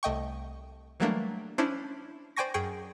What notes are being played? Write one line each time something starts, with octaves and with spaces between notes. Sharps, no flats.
C2 A3 D#5 G5 C#6
E3 F#3 G3 A3 A#3 D4
C#4 D4 E4 C5
C5 D5 G5 G#5 C#6 A#6
F#2 G#4 G5 C#6